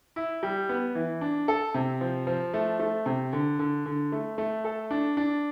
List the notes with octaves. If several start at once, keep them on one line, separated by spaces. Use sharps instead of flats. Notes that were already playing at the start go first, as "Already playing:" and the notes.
E4
G3
B3
E3
D4
A4
C3
F3
F3
A3
A3
C3
D3
D3
D3
A3
A3
A4
D4
D4